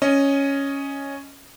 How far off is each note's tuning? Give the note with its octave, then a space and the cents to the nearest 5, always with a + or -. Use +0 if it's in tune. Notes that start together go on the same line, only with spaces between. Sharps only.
C#4 +0 D#5 +0